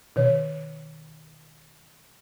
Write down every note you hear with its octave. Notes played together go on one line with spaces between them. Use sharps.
B2 D#3 C#5